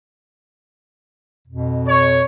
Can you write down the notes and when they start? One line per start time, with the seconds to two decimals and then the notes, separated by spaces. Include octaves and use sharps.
1.48 F2 B2
1.89 C#5